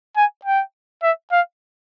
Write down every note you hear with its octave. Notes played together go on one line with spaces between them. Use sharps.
G#5
G5
E5
F5